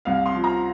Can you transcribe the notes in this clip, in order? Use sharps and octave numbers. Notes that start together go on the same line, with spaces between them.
C2 F5
C6
F3
A#5